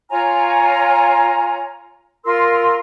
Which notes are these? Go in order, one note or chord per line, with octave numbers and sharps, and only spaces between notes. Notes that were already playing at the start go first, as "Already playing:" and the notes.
F4 C#5 G#5 A#5
F4 A#4 C6 E6